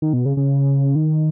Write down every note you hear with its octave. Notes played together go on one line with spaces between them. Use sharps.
D#3
B2
C#3
C#3
D#3